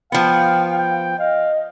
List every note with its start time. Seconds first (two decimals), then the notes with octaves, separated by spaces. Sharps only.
0.12 F3 B3 F5 G5
0.78 G5
1.19 D#5 F5